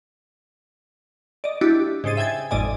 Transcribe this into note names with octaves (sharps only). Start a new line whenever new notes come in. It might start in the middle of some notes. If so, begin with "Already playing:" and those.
D5 D#5
D4 E4 F#4 G4
G#2 C#3 C5 A6 D#7
E5 G5 G#5 G#6 A6
G#1 F2 A2 D5 D#5 G#5